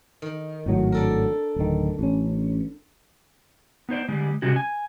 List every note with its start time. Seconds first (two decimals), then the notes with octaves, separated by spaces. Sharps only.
0.22 D#3
0.66 G#1 A2 F#3
0.92 D4 A4 A#4
1.56 D1 D#3
1.99 A1 C#4
3.89 B3 D#4 C5 D5
4.09 D3 G3 G#3
4.42 C3 G3 G#3 C#4 F#4
4.56 G#5